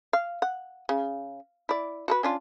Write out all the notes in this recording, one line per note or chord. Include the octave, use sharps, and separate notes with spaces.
F5
F#5
C#3
E4 D5
F#4 A4 B4
C#4 D4 F4